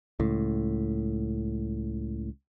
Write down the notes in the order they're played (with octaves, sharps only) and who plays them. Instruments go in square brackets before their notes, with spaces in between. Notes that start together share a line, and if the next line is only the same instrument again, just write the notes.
[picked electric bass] C#2 A2